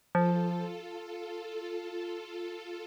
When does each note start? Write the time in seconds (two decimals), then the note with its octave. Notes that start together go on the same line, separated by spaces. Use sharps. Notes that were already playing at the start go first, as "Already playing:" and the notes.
0.14 F3 F4 A4
0.50 F4 A4